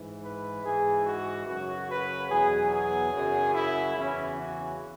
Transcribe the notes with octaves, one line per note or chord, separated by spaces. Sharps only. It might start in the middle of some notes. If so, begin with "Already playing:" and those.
Already playing: G#2 E3
B4
G#2 E3 G#4
F#4
F#2 C#3 F#3 F#4
B4
E2 B2 F#3 G#4
G#4
F#2 C#3 F#3
E4
E2 C#3 E3 C#4
F#4